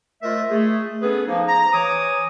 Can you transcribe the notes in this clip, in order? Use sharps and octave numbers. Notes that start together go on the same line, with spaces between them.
A3 F4 A#4 C5 D#5 E5
A3 G#4
B3 C#4 G#4 A4 B4
F3 A#3 D#4
A#5
E3 C#5 D6 D#6